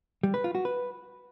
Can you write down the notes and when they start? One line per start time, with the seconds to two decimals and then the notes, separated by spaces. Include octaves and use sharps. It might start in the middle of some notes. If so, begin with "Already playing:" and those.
0.23 G3
0.34 B4
0.44 F4
0.55 F#4
0.65 B4